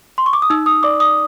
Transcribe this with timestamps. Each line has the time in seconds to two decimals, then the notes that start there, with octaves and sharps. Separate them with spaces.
0.18 C6
0.26 C#6
0.33 D6
0.42 D#6
0.50 D#4 E6
0.66 D#6
0.83 D5 D6
1.00 D#6